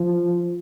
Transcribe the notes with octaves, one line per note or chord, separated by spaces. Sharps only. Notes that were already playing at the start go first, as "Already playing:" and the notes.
Already playing: F3